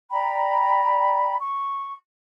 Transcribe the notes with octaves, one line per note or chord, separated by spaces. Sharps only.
D5 G5 A#5 B5
C#6